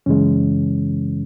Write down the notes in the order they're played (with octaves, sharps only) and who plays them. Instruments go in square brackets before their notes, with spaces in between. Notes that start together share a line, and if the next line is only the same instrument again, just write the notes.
[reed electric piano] F#2 C#3 E3 G#3 C#4